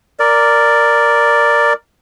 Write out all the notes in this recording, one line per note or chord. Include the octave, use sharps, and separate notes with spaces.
A#4 D5